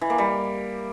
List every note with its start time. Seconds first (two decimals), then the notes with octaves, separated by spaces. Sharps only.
0.01 E3
0.10 A#3
0.18 G3